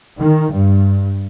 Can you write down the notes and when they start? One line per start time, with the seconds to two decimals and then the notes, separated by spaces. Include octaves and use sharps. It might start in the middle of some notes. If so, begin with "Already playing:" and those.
0.17 D#3
0.53 G2